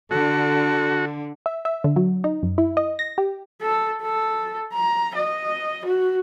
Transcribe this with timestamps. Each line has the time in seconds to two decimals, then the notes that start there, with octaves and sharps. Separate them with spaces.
0.11 D3 F#4 A4
1.46 E5
1.65 E5
1.84 D3
1.96 F#3
2.24 D#4
2.43 F#2
2.58 E4
2.77 D#5
2.99 A#6
3.18 G4
3.61 A4
4.01 A4
4.73 A#5
5.15 D#5
5.85 F#4